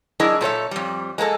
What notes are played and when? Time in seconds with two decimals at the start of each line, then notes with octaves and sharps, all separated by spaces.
0.20 F#3 D4 E4 G#4 A#4 D#5
0.41 A#2 A4 C#5 E5
0.71 F2 G3
1.18 G#3 A#3 D4 A4